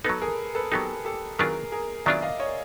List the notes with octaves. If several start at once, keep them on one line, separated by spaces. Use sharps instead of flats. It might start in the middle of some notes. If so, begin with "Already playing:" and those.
F#3 B3 D#4 A4 B4
G#4 A#4
A4 B4
F#3 B3 D#4 G4 A4
G4 A4
D#3 F#3 B3 D4 F4 G#4 A#4
G#4 A#4
D#3 F#3 B3 D4 F4 D5 E5
D#5 F5
C#5 D#5